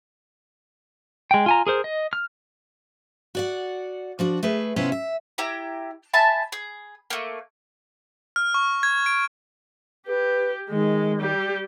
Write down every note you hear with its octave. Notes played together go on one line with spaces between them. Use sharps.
G#3 G5
F4 G#5 A#5
G#4 A#4 C5
D#5
F6
F#4 D5 F#5
F3 D4 F#4
A3 G#4 B4
C3 B3 C#4 E4 F4 E5
E5
E4 G4 A#5
E5 G#5 A5 B5
G#4
A3 A#3
F6
C#6
G#6
D7
G4 B4
D#3 G#3
G3 G4